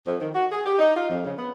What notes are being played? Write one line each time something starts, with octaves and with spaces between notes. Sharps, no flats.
F2
D#3
F#4
G#4
G4
D#4
F4
F2
C#3
B3